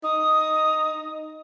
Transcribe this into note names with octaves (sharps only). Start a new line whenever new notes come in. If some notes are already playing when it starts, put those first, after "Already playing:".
D#4 D#6